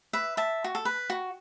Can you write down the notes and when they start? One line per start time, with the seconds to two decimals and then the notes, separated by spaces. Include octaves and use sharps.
0.13 B4 E5
0.37 E5 A5
0.64 F#4
0.75 A4
0.85 B4
1.10 F#4